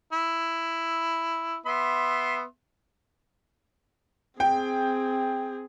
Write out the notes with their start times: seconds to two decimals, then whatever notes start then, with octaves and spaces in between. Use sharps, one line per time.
0.13 E4
1.66 B3 E5 C6
4.40 C4 G#4 G5